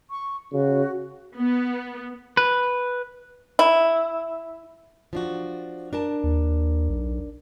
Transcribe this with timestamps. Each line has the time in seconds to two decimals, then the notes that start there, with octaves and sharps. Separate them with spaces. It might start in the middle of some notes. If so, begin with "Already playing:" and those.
0.11 C#6
0.53 C#3 F#4
1.36 B3
2.37 B4
3.59 E4
5.13 F3 D4 F#4
5.93 D4 A#4 A5
6.24 D#2
6.90 B1